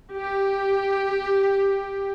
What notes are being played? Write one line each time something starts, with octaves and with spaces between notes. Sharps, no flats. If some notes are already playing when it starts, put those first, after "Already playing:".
G4